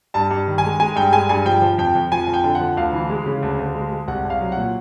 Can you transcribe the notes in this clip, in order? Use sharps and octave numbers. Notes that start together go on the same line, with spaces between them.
G2 A5
G2
D#3
G#5
G#3
G#3 G#5
G2 G5
G#3 G#5
G2 G#5
F3 G5
F3
F2 G5
F2
F3 G#5
F2
G5
D3
F#5
F3
D2 F5
E3
G#3
C#3
D2
D2
G#3
G#3
C2 F#5
C2
F5
F#3
F#5
A#2